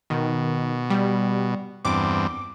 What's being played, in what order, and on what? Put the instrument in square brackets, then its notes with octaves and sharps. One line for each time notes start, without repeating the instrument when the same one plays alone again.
[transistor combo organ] B2 [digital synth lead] D#3
[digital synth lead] G3
[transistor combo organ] E2 G2 C4 [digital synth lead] D6